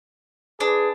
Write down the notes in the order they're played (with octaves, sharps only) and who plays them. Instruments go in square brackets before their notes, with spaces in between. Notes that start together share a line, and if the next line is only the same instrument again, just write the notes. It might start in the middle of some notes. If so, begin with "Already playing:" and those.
[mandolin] D4 [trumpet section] G#4 B4